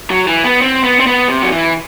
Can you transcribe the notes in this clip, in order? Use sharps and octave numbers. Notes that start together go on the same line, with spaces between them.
F#3
E3
B3
C4
B3
C4
B3
C3
F#3
E3